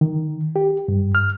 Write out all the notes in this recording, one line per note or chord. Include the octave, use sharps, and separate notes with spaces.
D#3
G4
G2
F6